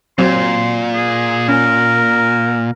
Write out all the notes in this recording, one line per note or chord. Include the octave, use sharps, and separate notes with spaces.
A#2 F#3 C4 C6
G#4
C#4 A#4